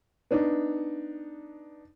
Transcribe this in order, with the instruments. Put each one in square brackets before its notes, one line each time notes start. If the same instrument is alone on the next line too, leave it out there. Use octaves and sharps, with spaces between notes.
[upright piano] B3 D4 D#4